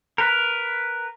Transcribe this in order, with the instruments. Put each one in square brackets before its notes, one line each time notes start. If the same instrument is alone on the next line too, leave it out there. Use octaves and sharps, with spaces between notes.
[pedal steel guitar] A#4 B4